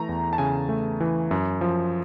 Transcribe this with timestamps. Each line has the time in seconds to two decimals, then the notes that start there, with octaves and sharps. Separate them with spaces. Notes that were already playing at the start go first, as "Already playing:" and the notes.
Already playing: E3 A3 A#5
0.09 E2
0.33 A5
0.38 C#3 G#5
0.69 A3
1.00 E3
1.31 F#2
1.61 F3